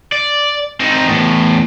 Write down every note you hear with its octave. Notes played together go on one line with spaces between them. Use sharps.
D5
C4 D#4
E2 A2